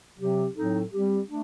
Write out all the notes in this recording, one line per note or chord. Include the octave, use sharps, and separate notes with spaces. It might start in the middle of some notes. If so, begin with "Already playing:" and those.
C3 F#3 C4 G4
A2 F#3 C4 D#4 A4
G3 C4 G4
A3 D4